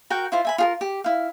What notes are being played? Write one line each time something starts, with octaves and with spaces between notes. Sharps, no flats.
F#4 A#4 F#5 G5
E4 F4 C5
E5 G#5 B5
F4 G#4 A#4
G4
E4 F5